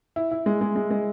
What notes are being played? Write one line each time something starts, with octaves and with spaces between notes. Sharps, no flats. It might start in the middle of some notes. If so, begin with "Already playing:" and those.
E4
E4
G#3
G#3
G#3
G#3